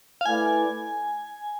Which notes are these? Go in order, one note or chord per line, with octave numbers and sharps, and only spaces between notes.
F5
A3 E4 B4 D5 G#5